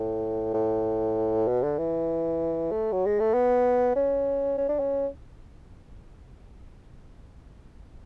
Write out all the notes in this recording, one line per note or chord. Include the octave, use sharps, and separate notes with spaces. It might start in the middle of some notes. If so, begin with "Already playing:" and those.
Already playing: A2
A2
B2
D3
E3
A3
F#3
G#3
A3
B3
C#4
C#4
D4
C#4